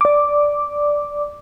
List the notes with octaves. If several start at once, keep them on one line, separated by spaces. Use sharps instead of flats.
D5 D6